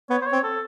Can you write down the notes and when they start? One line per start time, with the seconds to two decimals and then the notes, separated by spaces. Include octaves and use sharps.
0.10 B3 C#5
0.22 C5
0.26 C#5
0.32 C4
0.44 A4